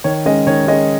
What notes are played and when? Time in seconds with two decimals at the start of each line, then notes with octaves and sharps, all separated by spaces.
0.04 D#3 C#5
0.25 G#3 C#4 D#5
0.47 D#3 C#5
0.68 G#3 C#4 D#5